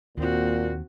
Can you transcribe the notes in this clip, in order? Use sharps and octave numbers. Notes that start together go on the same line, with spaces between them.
D#2 A#2 C4 F#4